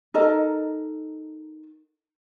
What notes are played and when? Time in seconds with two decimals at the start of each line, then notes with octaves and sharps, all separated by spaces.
0.14 D#4 A4 A#4 D#5